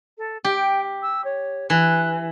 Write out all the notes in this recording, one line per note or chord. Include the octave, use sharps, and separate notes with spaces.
A4
G4 G5
E6
C#5
E3 F#6